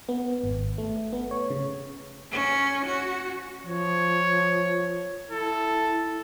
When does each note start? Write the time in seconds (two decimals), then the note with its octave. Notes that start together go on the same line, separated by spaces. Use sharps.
0.09 B3
0.44 G#1
0.78 A3
1.13 B3
1.31 C#5
1.50 C#3
2.32 C#4
2.86 F#4
3.64 F3 C#5
5.30 E4 A4